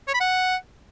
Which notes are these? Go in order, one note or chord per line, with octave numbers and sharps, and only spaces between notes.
C#5
B5
F#5